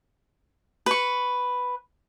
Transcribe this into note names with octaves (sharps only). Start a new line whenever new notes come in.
B4 C#6